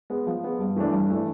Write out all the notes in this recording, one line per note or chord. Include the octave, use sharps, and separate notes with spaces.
G#3 B3
F3
G#3 B3
G2
E3 A3 D4
G2
E3 A3 D4